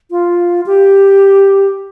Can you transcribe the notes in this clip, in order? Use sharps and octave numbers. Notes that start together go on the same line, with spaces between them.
F4
G4